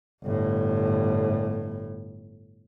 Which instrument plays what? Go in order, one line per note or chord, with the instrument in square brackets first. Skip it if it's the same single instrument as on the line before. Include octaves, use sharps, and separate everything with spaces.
[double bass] G1 A2